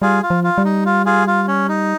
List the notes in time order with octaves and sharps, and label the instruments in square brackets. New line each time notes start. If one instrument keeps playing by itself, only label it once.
[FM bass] G3 [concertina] F4 G#4
[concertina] F4
[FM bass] F3
[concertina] F4
[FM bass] G3
[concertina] D#4
F4
F4 G#4
F4
C#4
D#4